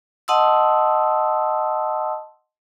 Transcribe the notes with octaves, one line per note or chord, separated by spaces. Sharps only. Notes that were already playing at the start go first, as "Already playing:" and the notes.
D#5 F#5 A5 C6 D#6 E6